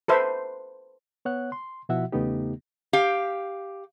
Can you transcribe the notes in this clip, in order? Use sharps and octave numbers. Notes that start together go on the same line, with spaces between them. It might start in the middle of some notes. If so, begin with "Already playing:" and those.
A4 B4 C5 E5
B3 C#5 F#5 F#6
C6
B2 F3 E4 F#4 E5 F#5
E2 C#3 A3 B3 D#4 G4
G4 F5